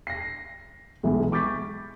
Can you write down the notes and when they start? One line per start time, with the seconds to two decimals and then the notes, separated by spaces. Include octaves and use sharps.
0.07 A#6 C7
1.03 B1 E3 G#3
1.32 C#6 D6 G6 A6 B6